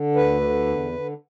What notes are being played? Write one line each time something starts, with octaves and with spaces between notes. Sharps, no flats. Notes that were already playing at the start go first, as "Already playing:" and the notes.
Already playing: D3
D2 B4
D3
E2
D3